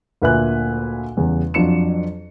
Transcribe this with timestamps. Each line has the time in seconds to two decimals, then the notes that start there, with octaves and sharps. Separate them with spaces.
0.22 D2 A#2 B4 E5 G#5 F#6
1.17 E2 C#3 G3
1.54 F2 F#3 D4 F4 C#7 E7